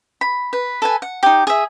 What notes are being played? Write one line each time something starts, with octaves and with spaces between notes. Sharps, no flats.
B5
B4
A4 B4 G#5
F#5
D#4 G4
G#4 E5